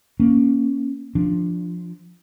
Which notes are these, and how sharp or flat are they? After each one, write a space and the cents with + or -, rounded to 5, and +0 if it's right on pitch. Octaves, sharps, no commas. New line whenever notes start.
A#3 +20 C#4 +0
F3 +0 D4 +0